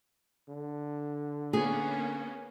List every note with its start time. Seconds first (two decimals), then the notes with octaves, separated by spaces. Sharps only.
0.49 D3
1.53 A#3 B3 C#4 G#4